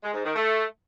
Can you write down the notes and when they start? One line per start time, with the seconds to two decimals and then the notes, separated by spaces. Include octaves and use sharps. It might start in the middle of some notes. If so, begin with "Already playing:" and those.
0.03 G#3
0.14 G#2
0.25 D#3
0.36 A3